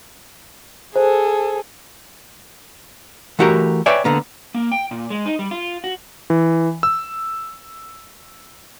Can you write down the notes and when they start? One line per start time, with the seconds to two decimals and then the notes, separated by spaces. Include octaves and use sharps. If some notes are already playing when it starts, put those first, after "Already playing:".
0.96 G#4 A4 C5
3.39 E3 A3 F#4 G4 A#4
3.86 B4 C#5 D5 E5 G5 G#5
4.04 D3 A#3 B3
4.54 A#3
4.72 G5
4.91 A#2
5.10 G#3
5.26 D#4
5.39 G3
5.51 F4
5.84 F#4
6.30 E3
6.83 E6